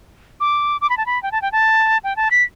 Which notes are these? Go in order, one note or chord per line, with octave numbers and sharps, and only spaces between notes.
D6
D6
B5
A5
B5
G5
A5
G5
A5
G5
A5
B6